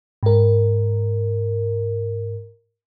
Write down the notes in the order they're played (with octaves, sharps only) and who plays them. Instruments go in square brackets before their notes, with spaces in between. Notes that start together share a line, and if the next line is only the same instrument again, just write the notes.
[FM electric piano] G#2 A#4